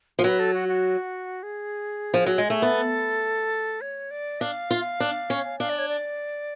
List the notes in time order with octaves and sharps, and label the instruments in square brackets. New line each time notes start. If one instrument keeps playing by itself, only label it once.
[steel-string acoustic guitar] F3
[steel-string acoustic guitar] F#3 [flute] B4
[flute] A4
F#4
F#4
G#4
[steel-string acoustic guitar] F3
F#3
G#3
A3
[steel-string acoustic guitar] B3 [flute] A4
[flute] C#5
D5
[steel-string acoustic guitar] D4 [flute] F5
[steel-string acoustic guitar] F4
D4
C#4
[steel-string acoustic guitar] D4 [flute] F5
[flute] D5
C#5
D5